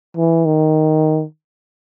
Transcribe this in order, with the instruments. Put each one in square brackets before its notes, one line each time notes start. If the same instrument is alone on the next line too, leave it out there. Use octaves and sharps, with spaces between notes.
[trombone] E3
D#3